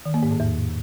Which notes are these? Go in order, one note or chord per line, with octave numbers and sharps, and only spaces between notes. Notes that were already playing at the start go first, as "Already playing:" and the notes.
D#3
A#3
G#2
A2
E2